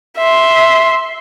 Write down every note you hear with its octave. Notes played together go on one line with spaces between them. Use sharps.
E5 C6